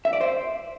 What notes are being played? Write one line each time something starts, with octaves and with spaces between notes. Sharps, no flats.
E5
D5
C5